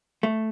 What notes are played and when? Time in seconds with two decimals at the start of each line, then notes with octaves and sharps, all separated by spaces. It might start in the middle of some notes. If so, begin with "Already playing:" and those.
0.23 A3